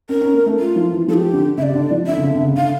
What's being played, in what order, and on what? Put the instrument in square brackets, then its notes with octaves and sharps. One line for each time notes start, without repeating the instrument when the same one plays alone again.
[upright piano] C#4 [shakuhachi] A#4
[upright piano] C#4
A#3
A3
[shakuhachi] F4
[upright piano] F3
E3
[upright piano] F3 [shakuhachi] A4
[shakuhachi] G4
[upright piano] D3
[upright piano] C#3 [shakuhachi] E5
[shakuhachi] D5
[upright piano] D3
F3
[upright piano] D3 [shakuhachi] E5
[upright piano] C#3
D3
D3
C#3
[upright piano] D3 [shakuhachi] F5